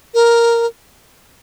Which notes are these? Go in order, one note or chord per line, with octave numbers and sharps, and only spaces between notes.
A#4